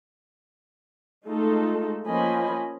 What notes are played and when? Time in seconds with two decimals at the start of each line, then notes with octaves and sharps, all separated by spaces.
1.25 G#3 A3 D#4 F4 A4
2.08 F3 A#3 C#4 D#5 G#5 B5